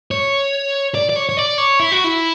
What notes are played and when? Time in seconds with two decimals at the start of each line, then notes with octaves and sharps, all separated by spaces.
0.11 C#5
0.95 D5
1.10 D5
1.16 C#5
1.29 C#5
1.37 D5
1.58 C#5
1.80 E4
1.92 F#4
2.04 E4